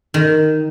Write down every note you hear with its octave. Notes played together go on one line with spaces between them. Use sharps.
D#3